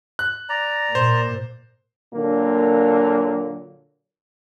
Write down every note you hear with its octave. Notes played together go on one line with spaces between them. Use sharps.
F#6
D5 A#5
A#2 C5
A#2 D3 F#3 A#3